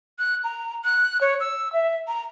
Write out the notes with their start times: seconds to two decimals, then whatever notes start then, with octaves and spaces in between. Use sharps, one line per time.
0.19 F#6
0.44 A#5
0.84 F#6
1.21 C#5
1.40 E6
1.73 E5
2.08 A#5